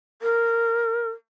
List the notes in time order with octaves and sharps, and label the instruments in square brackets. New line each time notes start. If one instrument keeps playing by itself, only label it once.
[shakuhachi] A#4